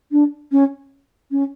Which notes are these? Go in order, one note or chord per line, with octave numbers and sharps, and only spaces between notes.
D4
C#4
C#4